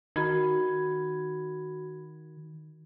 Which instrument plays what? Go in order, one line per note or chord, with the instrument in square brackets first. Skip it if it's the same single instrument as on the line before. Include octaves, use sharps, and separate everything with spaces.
[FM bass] D#3 [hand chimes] F#4 B5 G#6